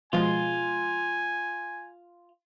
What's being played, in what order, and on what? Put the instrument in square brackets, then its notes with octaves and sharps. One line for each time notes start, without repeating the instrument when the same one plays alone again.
[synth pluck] B2 F3 G#3 [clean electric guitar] F4 [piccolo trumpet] G#5